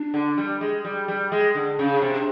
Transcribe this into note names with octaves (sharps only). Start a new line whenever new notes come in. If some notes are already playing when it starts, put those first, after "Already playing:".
Already playing: D4
D3
G3
G#3
G3
G3
G#3
D3
C#3 C#4
D4
C3
D4